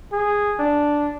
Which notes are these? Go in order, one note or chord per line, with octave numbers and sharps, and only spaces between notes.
G#4
D4